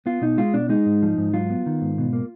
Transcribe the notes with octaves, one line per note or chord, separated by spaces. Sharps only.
B3 F4
B2 D#4
G#3 F4
B2 D4
G#3 D#4
G#2
F3
G#2
F#3 F4
B3
D#3
G#2
B2
A#3